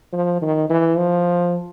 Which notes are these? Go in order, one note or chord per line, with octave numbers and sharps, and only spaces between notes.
F3
D#3
E3
F3